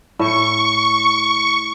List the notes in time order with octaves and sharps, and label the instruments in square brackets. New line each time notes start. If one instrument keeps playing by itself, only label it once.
[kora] A2 [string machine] C#6